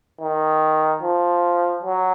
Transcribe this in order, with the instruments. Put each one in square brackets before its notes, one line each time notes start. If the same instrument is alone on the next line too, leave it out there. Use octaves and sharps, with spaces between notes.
[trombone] D#3
F3
F#3